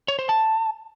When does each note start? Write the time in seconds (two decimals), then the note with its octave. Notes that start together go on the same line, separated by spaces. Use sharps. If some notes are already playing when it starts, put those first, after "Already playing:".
0.08 C#5
0.19 C5
0.29 A5